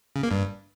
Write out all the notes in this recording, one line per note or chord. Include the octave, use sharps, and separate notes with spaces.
C#3
A#3
G2